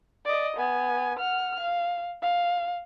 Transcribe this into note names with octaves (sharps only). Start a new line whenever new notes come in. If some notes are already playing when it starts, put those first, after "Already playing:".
D5 D#5
B3 G#5
F#5 F6
F5
F5